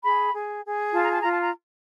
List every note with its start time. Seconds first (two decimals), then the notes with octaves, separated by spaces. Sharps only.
0.04 G#4 B5
0.34 G#4
0.64 G#4
0.94 F4 A5
1.03 A#5
1.12 A5
1.22 F4 A#5
1.31 A5
1.41 A#5